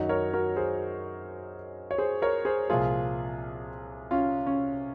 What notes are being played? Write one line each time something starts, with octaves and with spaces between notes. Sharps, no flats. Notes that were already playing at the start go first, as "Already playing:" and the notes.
Already playing: F#2 D#3 D#4 F#4
A#4 C#5
F#4 A#4
G#4 C5
C#5
G#4 C5
A#4 C#5
G#4 C5
C2 A#2 F3 F4 G#4
C#4 F4
C#4